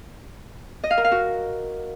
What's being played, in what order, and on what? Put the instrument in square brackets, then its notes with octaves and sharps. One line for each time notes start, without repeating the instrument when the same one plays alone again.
[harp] D#5
F5
A#4
F5
F#4